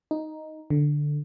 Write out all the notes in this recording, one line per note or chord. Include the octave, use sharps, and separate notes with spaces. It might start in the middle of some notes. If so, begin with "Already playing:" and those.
D#4
D3